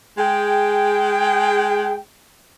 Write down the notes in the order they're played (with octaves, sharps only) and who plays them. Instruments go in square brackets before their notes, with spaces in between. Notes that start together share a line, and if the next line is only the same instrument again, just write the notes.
[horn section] G#3 G#4 G5